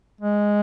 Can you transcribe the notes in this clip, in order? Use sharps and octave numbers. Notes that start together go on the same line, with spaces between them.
G#3